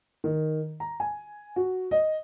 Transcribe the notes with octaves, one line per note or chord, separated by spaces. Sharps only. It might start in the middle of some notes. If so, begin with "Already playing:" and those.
D#3
A#5
G#5
F#4
D#5